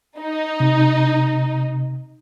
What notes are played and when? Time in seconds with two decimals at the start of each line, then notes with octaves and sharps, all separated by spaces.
0.20 D#4
0.60 C3